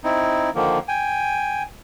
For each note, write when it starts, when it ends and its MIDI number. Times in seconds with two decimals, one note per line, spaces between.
0.04 0.50 60
0.04 0.50 63
0.04 0.50 64
0.55 0.79 50
0.55 0.79 51
0.55 0.79 53
0.55 0.79 58
0.88 1.63 79
0.88 1.63 80